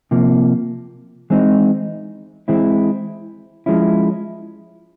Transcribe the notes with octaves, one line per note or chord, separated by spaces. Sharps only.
C3 F3 A#3
E3 G#3 C4 D#4
E3 G#3 C4 E4
F3 G#3 C#4 E4